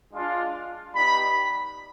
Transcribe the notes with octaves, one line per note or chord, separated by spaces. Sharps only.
G#3 D4 F4
G3 B3 D#4 G4 B5